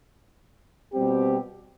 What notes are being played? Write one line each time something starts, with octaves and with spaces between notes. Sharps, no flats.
B2 G3 C4 G4